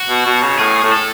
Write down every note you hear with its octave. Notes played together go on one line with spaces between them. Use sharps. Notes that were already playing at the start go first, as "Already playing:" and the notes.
Already playing: F#4
B2
B2
C#3
A2 G#4
A2
A4